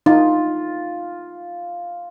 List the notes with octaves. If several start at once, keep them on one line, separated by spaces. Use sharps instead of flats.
D#4 F4